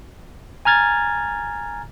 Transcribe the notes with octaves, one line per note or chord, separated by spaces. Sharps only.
G#5 A#5 F6 G#6 A6